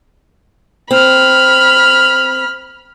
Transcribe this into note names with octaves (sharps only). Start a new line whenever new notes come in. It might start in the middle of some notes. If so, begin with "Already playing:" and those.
C4 B5 F6